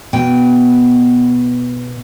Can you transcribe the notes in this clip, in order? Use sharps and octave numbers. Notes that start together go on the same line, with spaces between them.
B2 G5